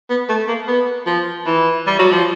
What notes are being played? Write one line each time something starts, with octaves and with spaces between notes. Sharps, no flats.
B3
A3
A#3
B3
F3
E3
G3
F#3
F3